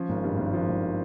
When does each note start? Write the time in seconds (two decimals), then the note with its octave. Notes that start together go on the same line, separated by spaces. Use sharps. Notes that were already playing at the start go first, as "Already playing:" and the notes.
Already playing: F3 C#4
0.09 G#1
0.24 G2
0.38 G#1
0.53 F3
0.69 G#1